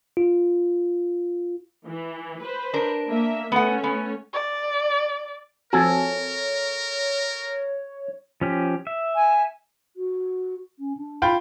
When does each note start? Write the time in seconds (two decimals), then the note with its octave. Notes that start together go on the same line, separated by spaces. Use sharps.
0.17 F4
1.86 E3
2.41 B4 C5
2.73 D4 A#4
3.07 A#3 E5
3.52 A3 B3 C#4 F#5
3.84 B3
4.34 D5
5.73 F3 C4 F#4 A4 A#4 C#5 G#5
8.41 F3 C#4 G4
8.87 E5
9.16 G#5
9.96 F#4
10.79 C#4
10.97 D4
11.22 F4 G5 B5